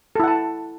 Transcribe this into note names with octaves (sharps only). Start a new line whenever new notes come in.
E4 A4 F#5 A5